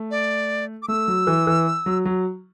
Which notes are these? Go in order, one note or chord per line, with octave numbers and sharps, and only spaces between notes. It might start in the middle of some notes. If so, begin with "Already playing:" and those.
Already playing: A3
D5
D6
A3 E6
F#3
E3
E3
F#3
F#3